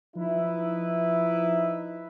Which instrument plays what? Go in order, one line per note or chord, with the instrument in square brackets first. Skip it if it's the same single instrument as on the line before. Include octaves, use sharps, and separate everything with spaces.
[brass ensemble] F3 D#4 E4 B4 E5